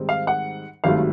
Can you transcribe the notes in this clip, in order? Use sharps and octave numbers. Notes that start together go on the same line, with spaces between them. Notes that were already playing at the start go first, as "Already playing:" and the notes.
Already playing: G#2 D#3 G3 C4 D#4
F5
F#5
G#1 G2 D#3 F#3 A3 F5